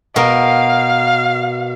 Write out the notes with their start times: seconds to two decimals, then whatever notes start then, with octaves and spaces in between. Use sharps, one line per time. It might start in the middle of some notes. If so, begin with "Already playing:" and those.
0.16 B2 A#4 F5